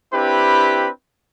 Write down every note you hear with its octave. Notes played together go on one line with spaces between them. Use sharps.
C4 D4 E4 G4 B4 B5